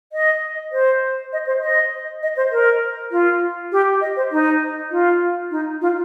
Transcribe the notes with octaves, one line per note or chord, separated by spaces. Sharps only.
D#5
C5
D#5
C5
D#5
D#5
C5
A#4
F4
G4
D#5
C5
D#4
F4
D#4
F4